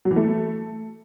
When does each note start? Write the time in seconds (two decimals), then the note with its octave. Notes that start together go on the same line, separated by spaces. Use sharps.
0.05 F#3
0.11 E3
0.16 A3